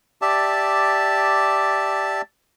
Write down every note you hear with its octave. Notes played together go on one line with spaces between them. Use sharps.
G4 D5 E5 A5